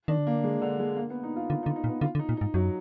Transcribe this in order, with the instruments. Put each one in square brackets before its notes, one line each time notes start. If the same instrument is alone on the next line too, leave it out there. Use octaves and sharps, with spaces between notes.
[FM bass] D#3 [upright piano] D4
[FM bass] D3
[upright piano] A#3
G#3
D3
G#3
A#3
B3
D#4
F4
[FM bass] D3 [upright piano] F4
[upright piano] D#4
[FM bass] D3
[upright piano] D#4
[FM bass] A#2
[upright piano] B3
[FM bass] D3 [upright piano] F4
[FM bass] D3
[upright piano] D#4
[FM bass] A#2
[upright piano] D#4
[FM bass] G#2
[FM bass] F#2 [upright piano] F#3